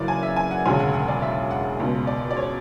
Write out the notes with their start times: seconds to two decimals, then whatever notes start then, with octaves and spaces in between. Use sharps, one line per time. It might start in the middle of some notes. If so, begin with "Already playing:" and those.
Already playing: F#1 F#2 C#3 E3 D5
0.08 G#5
0.23 E5
0.36 G#5
0.51 F#5
0.66 E1 D2 C#3 G#5
0.79 F#5
0.93 F#5
1.08 D5
1.22 E5
1.51 F#5
1.80 C#2 B2
2.07 D5
2.31 D5
2.36 C#5